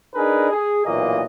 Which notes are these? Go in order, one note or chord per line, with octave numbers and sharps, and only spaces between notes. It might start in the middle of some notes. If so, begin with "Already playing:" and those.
D4 D#4 G#4 A#4 B4
G#4
B1 A#2 E3 A#3 D#5